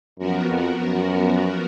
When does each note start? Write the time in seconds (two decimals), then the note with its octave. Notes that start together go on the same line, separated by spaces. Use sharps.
0.19 F#2 F3 B3 F#4 A#4
0.50 F2
0.80 F#2